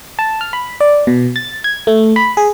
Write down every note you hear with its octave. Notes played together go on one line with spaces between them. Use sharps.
A5
F6
B5
D5
B2
A6
G#6
A3
B5
G#4